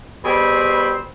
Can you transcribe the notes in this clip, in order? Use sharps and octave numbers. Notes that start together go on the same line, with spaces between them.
B2 G3 C4 G#4 C5 B5